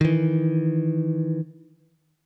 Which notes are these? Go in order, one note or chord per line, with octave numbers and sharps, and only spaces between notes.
D#3 E3